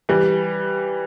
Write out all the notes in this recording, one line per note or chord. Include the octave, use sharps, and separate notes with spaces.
E3 G3